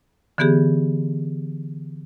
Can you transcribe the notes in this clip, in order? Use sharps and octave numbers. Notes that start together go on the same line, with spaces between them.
D3 E3 B3 G4 G#4